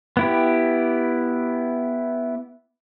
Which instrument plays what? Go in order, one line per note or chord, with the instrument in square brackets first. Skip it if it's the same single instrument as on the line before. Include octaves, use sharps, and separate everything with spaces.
[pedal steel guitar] B3 E4 G4